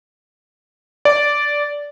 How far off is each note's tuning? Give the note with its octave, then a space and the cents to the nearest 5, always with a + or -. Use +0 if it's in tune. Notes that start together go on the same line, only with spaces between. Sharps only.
D5 -10